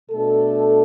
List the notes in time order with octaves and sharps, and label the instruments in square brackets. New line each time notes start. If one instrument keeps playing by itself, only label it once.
[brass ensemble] B2 A3 D4 A4